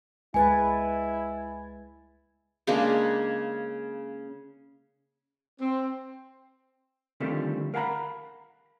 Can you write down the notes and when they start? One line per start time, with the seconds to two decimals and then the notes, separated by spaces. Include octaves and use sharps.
0.34 C#2 G#3 E4 B4 G#5 G#6 A6
2.67 C#3 G#3 A#3 D4
5.60 C4
7.20 D3 D#3 F3 G3 A3 C4
7.74 A#4 F5 F#5 G#5 A#5 B5